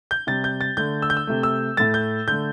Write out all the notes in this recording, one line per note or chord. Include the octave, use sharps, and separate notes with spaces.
G6
C3 G3 A6
G6
A6
D3 A3 G6
E6
G6
E6
C3 A3
E6
A2 A3 A6
G6
D3 A3 G6